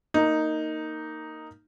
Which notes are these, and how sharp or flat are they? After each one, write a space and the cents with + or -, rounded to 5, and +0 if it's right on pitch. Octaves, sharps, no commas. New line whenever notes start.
A#3 -10 D#4 +0